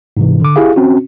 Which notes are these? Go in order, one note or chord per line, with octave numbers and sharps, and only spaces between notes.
G#2 C3 E3
D3 D6
E4 G4 G#4 F5
C4 C#4 F#4